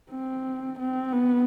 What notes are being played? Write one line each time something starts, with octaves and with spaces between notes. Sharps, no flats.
C4
C4
B3